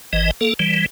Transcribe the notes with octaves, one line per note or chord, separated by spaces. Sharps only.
G#1 E3 D#5
A#3 A4
E3 G3